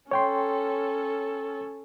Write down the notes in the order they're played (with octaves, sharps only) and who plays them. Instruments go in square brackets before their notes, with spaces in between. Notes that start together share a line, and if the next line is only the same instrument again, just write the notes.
[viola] C#4 A4 [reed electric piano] C#5 G5 C6